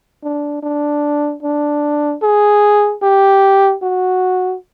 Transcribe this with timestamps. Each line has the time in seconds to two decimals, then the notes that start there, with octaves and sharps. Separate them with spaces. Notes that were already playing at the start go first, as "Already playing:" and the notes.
0.23 D4
0.62 D4
1.43 D4
2.22 G#4
3.02 G4
3.82 F#4